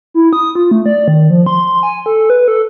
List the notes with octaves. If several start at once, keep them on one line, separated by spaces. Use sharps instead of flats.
E4
D#6
F4
A3
D5
D#3
F3
C6
G#5
A4
B4
A4